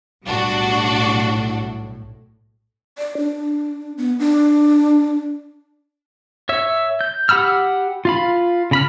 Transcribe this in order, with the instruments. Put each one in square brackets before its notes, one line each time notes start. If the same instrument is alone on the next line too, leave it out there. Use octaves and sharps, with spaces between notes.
[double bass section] B1 A2 [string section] G3 D4 F#4
[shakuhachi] D5
D4
B3
D4
[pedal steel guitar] C#5 E5
G6
G4 F#5 B5 E6 F6
F4 F5 B5
C#3 B5 F6